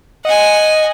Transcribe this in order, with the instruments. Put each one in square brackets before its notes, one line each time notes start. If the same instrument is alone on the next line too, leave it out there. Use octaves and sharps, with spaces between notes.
[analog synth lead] D#5 [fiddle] F#5 G#5